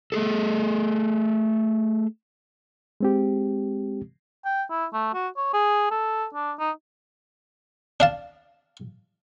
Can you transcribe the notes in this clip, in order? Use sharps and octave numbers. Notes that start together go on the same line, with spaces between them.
A3 G#4 A4
G#3 C4 G4
G5
E4
A3
F#4
C#5
G#4
A4
D4
D#4
D4 F5 A5